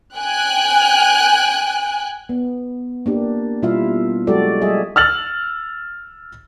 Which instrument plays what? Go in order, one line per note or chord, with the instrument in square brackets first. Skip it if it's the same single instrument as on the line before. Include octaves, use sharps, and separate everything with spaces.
[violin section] G5 G#5 F#6
[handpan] B3
A#3 D4 G4
B2 G3 E4 F4 E5 F5
F#3 G#3 F#4 G4 A4 D5
F#3 G3 G#4 D#5 E5
[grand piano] E6 F6 A6 F#7